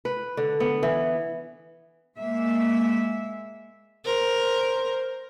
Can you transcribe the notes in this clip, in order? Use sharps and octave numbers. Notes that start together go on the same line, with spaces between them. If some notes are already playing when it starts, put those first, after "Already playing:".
B4
D3
B3
E3
G#3 A#3 E5
A#4 C5